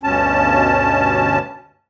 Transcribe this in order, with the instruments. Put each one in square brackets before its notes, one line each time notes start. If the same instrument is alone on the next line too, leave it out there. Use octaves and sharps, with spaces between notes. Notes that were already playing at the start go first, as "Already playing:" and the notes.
[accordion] D2 G2 B2 C#4 A5